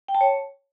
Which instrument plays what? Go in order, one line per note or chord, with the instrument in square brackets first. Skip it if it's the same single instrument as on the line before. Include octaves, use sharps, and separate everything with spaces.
[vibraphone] G5
A5
C#5